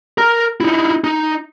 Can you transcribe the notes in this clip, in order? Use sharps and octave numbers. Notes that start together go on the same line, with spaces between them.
A#4 A#5
D#4 E4
D#4